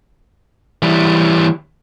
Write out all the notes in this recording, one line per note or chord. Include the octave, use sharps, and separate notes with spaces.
E3 G3